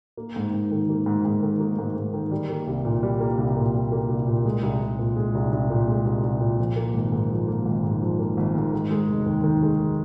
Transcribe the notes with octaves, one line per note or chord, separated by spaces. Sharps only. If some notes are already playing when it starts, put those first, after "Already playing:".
A#3
G#2
G#2
D#3
A#3
G#2
G#2
D#3
A#3
G#2
G#2
D#3
G3
A#3
C2
A#2
G3
A#3
C2
A#2
G3
A#3
C2
A#2
G#3
C2
C2
A#2
G#3
C2
C2
A#2
G#3
C2
C2
A#2
F3
A#3
G#1
G#2
F3
A#3
G#1
G#2
F3
A#3
G#1
G#2
D#3
G#3
F1
D#2
D#3
G#3